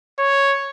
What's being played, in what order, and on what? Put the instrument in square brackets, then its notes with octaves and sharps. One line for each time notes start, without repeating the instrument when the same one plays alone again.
[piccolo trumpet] C#5